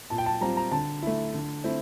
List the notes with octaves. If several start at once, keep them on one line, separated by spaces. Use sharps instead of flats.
A#2 A5
G5
A5
G3 C4 F4 A#5
A#5
D3 A5
A3 E4
D3
A3 C4 E4